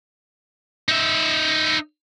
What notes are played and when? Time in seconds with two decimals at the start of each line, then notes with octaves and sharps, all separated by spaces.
0.88 D#4 E5